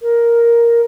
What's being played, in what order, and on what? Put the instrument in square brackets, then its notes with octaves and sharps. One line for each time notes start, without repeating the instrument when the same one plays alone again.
[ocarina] A#4